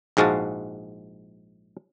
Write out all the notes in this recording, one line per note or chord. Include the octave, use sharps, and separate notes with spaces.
A#1 G#2 G#3 F#4 F5 A5